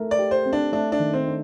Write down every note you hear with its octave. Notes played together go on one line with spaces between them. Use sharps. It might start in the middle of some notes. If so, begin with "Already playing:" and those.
Already playing: A3 A#4
D5
G4
C5
C4
D4
A3 D4
D4
D#3
C4
D4